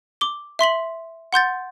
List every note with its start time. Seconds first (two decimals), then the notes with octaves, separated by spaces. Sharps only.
0.21 D6 G7
0.59 E5 C6 B6 F#7
1.33 F#5 C6 G6 A6